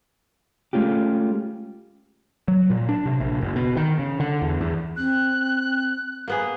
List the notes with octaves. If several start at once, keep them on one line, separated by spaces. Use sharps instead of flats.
G#3 A3 C#4 F4 G4
F#3
A#2
D4
C3
A#1
F#1
B2
D#3
C#3
D3
E2
E2
C4 F#6
A#3 B3 G#4